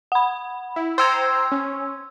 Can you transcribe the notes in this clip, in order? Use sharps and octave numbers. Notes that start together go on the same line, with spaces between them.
F#5 B5
E4
C5 G5 A#5 C6 E6 G#6
C#4